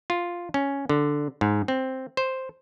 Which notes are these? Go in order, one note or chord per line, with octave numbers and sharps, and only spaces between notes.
F4
C#4
D3
G#2
C4
C5